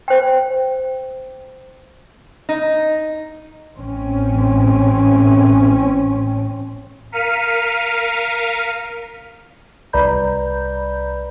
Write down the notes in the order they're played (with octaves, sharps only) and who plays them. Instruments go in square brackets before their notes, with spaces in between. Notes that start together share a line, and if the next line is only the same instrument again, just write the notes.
[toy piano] C5 G5
[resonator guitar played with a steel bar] D#4
[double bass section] A1 C4 C#4
[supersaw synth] A#4 F5 F6 B6 C#7 D#7
[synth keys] C2 B4 D5 A#5 B5 G6